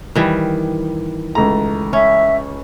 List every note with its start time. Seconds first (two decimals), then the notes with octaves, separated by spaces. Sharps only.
0.15 D#3 E3 G3
1.35 C#2 A3 A#5
1.93 C#4 E5